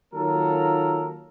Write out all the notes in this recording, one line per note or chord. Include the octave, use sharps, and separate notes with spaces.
D#3 F#3 A#3 F4 A4 A#4